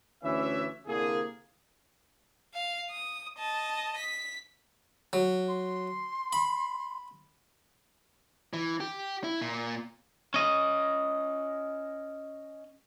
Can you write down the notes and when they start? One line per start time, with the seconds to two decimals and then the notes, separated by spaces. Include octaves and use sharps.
0.23 D2 E3 C#4 E5
0.87 C2 D3 A#3 G#4
2.55 F5
2.91 D#6
3.38 D#5 A5
3.98 B6
5.13 F#3
5.48 C6
6.33 B5
8.53 E3
8.80 G4
9.24 E4
9.41 A#2
10.34 C#4 D#5